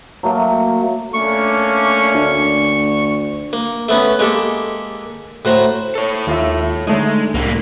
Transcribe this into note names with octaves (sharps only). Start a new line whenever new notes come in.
F#3 A3 A#3
A3 A#3 C#4 D4 C#6
D2
A#3
A3 B3 C#4
G#3 A#3 G4 A4
A2 F#4 C5 A#5
A4 C#5
D#2 F4 E5
D3 G#3 A3 D#4
C2 A2 D3 A#3 B6